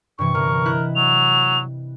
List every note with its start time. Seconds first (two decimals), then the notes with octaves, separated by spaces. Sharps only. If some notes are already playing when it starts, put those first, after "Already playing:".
0.19 G2 C3 E3 C#6
0.35 G1 A#4
0.65 E4 D#5 F#6
0.96 F#3 F7